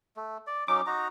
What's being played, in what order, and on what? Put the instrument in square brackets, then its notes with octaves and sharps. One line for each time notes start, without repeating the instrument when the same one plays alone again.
[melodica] A3
D5
[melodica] F#3 C#4 D#4 [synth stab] D6
[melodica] D#4 F#4 A#5